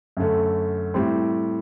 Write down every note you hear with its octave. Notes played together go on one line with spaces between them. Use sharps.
F#2 D3 A3
A2 G3 C4